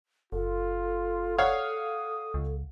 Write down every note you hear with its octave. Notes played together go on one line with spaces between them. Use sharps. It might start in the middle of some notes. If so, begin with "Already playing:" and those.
F#1 F4 A4
C#5 F5 F#5 D#6
C#2